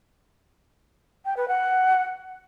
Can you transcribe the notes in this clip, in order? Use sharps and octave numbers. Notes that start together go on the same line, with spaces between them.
G5
B4
F#5